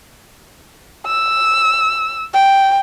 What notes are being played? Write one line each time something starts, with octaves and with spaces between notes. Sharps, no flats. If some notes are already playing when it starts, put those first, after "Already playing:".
E6
G5